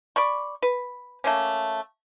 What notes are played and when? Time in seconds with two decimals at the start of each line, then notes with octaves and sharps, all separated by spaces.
0.16 D5 B5 C#6
0.62 B4
1.24 A3 A#3 C#4